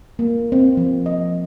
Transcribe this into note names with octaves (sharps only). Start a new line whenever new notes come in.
A#3
C4
F3
D#5